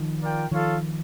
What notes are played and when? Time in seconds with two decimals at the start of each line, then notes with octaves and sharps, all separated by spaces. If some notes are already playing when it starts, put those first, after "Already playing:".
Already playing: D#3 F3
0.20 F4 A#4 D5 G5
0.51 D#3 F3 F4 A4 C#5 F5